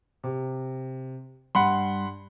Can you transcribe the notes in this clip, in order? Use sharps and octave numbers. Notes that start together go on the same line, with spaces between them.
C3
G2 F#5 B5 C6